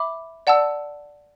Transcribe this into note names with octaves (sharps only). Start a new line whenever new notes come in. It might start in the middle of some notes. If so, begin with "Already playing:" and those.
Already playing: E5 B5 D6
D5 F#5 A5 E6